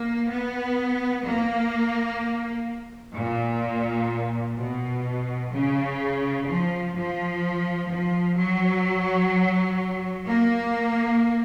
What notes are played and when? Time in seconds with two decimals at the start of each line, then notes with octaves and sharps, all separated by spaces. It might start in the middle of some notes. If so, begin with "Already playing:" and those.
Already playing: A#3
0.30 B3
1.25 A#3
3.15 A#2
4.58 B2
5.52 C#3
6.47 F3
6.95 F3
7.89 F3
8.37 F#3
10.26 A#3